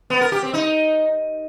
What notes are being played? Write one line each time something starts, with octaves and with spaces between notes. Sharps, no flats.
B3
A#4
G4
C4
D#4